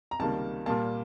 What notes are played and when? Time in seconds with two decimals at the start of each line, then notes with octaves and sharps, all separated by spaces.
0.11 A#5
0.19 C#2 C3 D#3 G3 A#3 A5
0.66 A#2 G3 A#3 A5